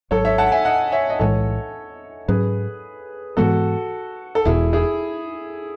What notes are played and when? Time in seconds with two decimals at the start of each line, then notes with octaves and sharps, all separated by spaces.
0.11 G#1 G#2 F#3 A4 C#5
0.25 C#5 E5
0.38 F#5 A5
0.52 E5 G#5
0.65 D#5 F#5
0.92 C#5 E5
1.10 D#5
1.19 B1 A2 E3 G#3 A4 C#5
2.28 G#2 F#3 C#4 G#4 B4
3.37 G#2 E3 G#3 B3 F#4 A4
4.35 A4
4.45 E1 E2 B2 E4 G#4
4.73 E4 G#4